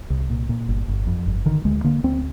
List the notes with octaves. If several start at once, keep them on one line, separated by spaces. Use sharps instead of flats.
C2
A#2
A#2
G1
G1
F2
G1
D3 D#3
D2 G#3
D3 A#3
D2 C4